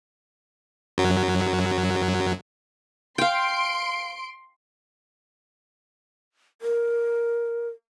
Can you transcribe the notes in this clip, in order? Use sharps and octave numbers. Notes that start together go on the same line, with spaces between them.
F#2 F#3
F5 G5 C6 D7
A#4